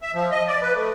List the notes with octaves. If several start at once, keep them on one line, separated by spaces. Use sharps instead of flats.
E5
F3
D#5
D5
B4
A3